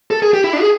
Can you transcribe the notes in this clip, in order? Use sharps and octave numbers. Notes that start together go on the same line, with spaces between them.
A4
G#4
G4
E4
D4
G#4